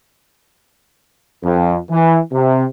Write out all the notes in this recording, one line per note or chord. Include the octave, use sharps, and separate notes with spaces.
F2
E3
C3